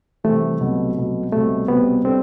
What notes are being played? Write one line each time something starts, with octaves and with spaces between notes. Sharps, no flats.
C3 E3 G3 A3 C4
C2 B2 F#3
C2 B2 F#3
C2 B2 G3 A3 C4
C2 B2 G3 B3 C4
G3 C4 D4 A4